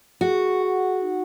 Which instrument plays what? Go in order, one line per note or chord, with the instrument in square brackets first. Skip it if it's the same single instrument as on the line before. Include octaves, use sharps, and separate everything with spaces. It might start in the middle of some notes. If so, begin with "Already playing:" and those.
[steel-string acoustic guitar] F#4 [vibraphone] G#4
[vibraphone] F#5
D#4